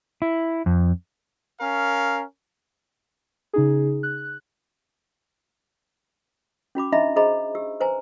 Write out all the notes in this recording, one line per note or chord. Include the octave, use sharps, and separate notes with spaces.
E4
F2
C#4 A#4 F5
C#3 D#4 G#4
F#6
C#4 F#4 B5 D6
D4 D#4 D#5 E5 A#5 B5
G#4 C5 D#5 A#5 B5
G4 E6
B4 C5 G#5 A#5